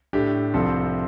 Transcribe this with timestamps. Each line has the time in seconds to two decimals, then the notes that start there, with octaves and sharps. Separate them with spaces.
0.13 A2 A3 D4 G4
0.54 C2 C3 F3 C4 A4